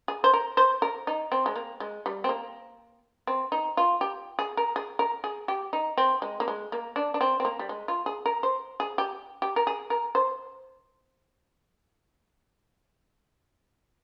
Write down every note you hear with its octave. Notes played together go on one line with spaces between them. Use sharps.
G#4
C5
A#4
C5
A#4
D#4
C4
G#3
A#3
G#3
G3
C4
A#3
C4
D#4
F4
G4
G#4
A#4
G#4
A#4
G#4
G4
D#4
C4
G#3
A#3
G#3
A#3
D4
D4
C4
C4
A#3
G3
G#3
F4
G#4
A#4
C5
G#4
G4
G4
A#4
G#4
A#4
C5